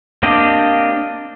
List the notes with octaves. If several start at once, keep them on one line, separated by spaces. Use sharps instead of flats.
A#3 C4 D4 G4 D#5